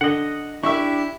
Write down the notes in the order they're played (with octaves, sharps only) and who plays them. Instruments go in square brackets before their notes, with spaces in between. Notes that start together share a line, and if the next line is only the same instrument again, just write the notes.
[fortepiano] D3 [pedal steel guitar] D#5 F#5
[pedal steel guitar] D4 G4 [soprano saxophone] E4 [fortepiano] E5 C#6